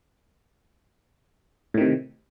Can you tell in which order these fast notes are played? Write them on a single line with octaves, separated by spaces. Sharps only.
A2 D#3 C3